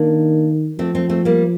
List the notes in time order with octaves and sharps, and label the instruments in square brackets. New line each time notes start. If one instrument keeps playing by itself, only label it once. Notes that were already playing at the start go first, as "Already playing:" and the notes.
Already playing: [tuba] D#3 [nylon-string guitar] A#3 D4
[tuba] F3 [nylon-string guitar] A3 C4
[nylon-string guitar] A3 C4
A3 C4
G3 A#3